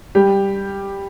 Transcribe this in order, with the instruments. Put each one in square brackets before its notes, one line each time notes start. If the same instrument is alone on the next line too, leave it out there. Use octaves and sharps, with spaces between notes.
[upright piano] G3 G4